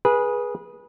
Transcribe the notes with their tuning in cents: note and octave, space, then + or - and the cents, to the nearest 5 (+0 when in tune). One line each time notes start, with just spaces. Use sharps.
G#4 +0 B4 -25